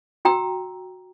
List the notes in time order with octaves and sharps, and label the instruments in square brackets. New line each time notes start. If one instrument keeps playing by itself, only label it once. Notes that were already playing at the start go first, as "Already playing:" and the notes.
[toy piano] F#4 G5 A#5 E6